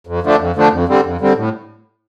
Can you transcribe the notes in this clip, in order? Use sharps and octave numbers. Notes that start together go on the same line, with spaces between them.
F2
D3 F3 A3 D4
F2
D3 F3 A3 D4
F2
D3 G3 C4
F2
D3 G3 C4
A2